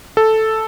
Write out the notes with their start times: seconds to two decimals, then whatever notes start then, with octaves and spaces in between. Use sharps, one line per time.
0.17 A4